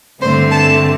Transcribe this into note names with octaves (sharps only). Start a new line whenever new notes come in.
G2 D3 A3 C4 C5 C6
A4 A5